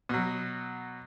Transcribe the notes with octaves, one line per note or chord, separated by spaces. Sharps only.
B2 F#3